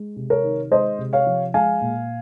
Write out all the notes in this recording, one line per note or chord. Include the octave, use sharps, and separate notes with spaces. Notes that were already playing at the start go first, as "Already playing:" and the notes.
Already playing: G#3
C3
A#4 C#5
D#3
G#3 C5 D#5
C3
C#5 F5
F3
G#3 F5 G#5
A#2